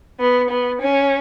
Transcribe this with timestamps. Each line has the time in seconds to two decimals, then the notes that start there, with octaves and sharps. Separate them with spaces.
0.20 B3
0.50 B3
0.81 C#4